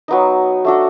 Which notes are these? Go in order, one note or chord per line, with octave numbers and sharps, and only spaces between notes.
F#3 B3 D#4
A3 D4 F#4 A4